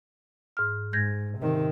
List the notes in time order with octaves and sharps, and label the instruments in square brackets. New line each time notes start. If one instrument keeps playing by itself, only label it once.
[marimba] G#2 F6
[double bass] G#2 [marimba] G6 G#6 A#6
[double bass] C3 D#3